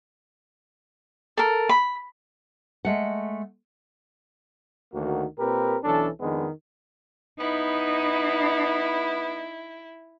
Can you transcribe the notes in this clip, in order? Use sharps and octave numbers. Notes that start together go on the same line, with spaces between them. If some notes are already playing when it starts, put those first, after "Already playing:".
A4 A#4
B5
G#3 A3 F#5
D2 D#3 A#3 F#4
A#2 C4 G4 A#4 B4
B1 E3 C#4 D4 A4
F2 D#3 G#3 B3 D4
B3 D#4 E4